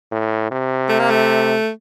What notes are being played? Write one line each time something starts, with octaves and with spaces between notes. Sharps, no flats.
A2
C3
A3
A#3
A3